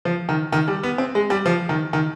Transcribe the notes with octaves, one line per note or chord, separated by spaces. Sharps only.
F3
D#3
D#3
G3
B3
C4
G#3
G3
F3
D#3
D#3